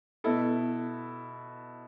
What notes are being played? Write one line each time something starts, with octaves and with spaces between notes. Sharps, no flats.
B2 B3 E4 A4